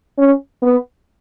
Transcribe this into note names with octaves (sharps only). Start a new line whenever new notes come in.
C#4
B3